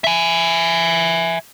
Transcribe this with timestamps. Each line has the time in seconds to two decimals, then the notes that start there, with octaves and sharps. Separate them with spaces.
0.04 E5 G#5